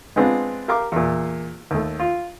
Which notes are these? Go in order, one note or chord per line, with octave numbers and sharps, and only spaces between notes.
G#3 B3 C4 D4 F4
G4 A#4 F5 D6
E2 A#2
D#2 A3
F4